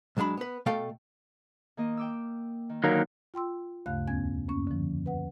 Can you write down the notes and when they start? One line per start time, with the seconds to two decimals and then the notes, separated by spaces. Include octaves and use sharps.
0.17 B1 F#3 G#3 D4 B5
0.37 B3 B4
0.66 B2 A3 A4 F5 G5
1.77 D#3 A#3 D#5
1.97 G5 D6 E6
2.69 D#3
2.84 D3 D#3 F#3 A#3
3.34 F4 G5 C6 E6
3.86 D2 G2 C#3 A3 F5 F#6
4.07 E2 B3 C#4 G#5 G#6
4.48 F#2 A#3 C#4 C#6
4.67 D3 F3
5.06 B4 F#5